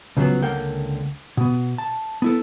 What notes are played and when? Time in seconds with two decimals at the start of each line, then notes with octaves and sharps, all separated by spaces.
0.17 C#2 C#3 F3 F#3 B3
0.42 C#2 D3 A#3 A#4 F#5 G5
1.37 B2 B3
1.78 A5
2.22 B3 E4 A4